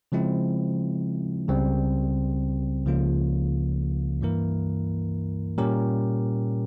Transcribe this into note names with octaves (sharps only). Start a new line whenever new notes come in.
C#3 F3 G#3 C4 E4
C#2 C#3 G3 C4
C#2 C#3 F3 A#3 F4
G2 E3 A#3 E4 A#4
A#2 G3 C#4 G4 A#4